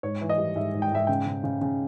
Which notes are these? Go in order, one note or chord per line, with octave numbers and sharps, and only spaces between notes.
G#2 C#5
E3
D#5
G3
G#2 E5
G#2
G5
G#2 E5
C#3 G5
C#3
C#3
C#3